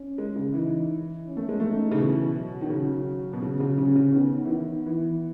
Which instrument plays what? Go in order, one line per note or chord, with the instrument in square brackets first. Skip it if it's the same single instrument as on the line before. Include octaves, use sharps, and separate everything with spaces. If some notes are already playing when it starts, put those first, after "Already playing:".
Already playing: [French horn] C#4
[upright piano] G#3
C#3
[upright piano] E3 [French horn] D#4
[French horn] C#4
[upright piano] A3
G#3
[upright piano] A3 [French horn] D#4
[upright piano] C#3
[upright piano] B2 [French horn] E3
[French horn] F#3
[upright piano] D#3
C#3
B2
[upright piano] C#3 [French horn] F#3
[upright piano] C#3
[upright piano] C#3 [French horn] C#4
[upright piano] C#3
[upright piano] D#3 [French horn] B3
[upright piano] E3
D#3
E3